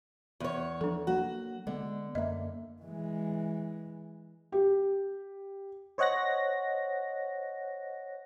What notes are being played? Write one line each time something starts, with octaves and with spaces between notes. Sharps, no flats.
E2 C#5
F3 D4 A4
F#3 A#3 F#4
D3 G#3 B3
F#2 A#3 D#5 E5
E3 G#3
G4
C5 C#5 D#5 F#5 F#6 A#6